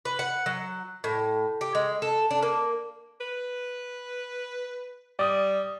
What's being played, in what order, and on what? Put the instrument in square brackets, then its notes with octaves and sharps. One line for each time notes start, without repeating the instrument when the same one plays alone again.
[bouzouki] B4
F#5
F#3
A2
G4
G#3
A4
D4
A#3
[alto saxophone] B4
[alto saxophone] G3 [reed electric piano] D5 D#6